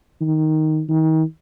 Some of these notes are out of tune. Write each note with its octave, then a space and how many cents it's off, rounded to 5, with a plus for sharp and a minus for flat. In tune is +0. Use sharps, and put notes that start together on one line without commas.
D#3 +5
D#3 +35